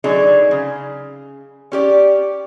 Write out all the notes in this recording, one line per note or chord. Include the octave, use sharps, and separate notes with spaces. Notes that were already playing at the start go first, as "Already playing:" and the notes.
D3 F#3 D4 D#4 G#4
C#3
C#4 G4 D5